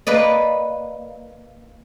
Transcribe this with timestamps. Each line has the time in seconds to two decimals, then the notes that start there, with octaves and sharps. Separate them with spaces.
0.07 A#3 B4 D5 D#5